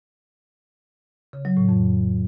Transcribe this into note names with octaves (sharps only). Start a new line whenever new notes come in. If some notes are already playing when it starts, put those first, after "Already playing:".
C#3
F#3
A2
F2